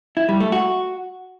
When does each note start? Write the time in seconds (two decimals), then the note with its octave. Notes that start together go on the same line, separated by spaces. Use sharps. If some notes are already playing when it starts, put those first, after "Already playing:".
0.17 E4
0.29 G3
0.40 A3
0.52 F#4